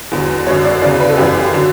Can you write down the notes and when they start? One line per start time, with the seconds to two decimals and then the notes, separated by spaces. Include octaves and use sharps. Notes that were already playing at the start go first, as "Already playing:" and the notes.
0.11 E2 D3 F#3
0.47 F#2 D3 F#3 C#5
0.65 D5
0.82 E2 C#3 F#3 D5
1.00 B4
1.09 A4
1.18 F#2 E3 G4
1.53 D3 F#3